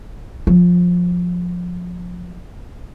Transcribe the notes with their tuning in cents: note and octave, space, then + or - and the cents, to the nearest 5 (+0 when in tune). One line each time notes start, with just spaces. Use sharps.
F3 +20